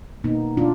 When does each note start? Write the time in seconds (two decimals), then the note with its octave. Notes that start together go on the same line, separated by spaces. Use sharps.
0.24 B2 A#3 B3 D#4
0.57 B2 D4 F4